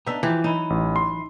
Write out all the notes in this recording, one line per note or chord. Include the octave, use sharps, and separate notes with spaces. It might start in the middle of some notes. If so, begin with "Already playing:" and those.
B3 D4 D#4 E5
E3 F3 G4
E3 F#3 D#4 E4
A1
C6